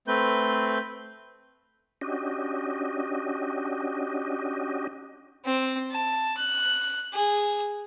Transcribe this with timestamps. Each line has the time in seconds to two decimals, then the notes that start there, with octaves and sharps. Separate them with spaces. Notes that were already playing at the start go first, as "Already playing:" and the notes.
0.08 A3 C4 B4 G6
2.01 C#4 D4 F#4 G4 D#5
5.45 C4
5.91 A5
6.37 F#6
7.13 G#4